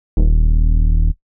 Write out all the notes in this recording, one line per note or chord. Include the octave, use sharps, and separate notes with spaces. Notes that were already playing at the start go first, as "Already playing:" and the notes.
D#1